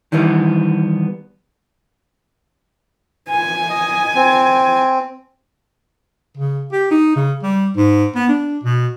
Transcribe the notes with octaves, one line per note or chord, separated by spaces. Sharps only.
D#3 E3 G3 B3
G#5
D#5
C4
C#3
G4
D#4
C#3
G3
G#2
B3
D4
B2